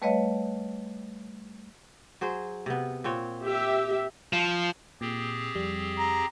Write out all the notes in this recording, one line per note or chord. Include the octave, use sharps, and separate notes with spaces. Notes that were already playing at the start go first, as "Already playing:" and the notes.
G3 A3 B4 C#5 D#5 F5
F#3 G#4 C5
C3 B3
A#2 C4 C#5
G4 E5
F3
A#2 C4 G4 G#4
F2 G3
A#5